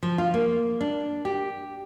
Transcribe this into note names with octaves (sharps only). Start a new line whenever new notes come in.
F3
F4
A#3
D4
G4